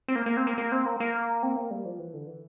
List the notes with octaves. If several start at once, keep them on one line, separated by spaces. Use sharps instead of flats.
C4
A#3
A#3
C4
A#3
A#3
C4
A#3
A#3
C4
A#3
G3
F3
E3
D3
E3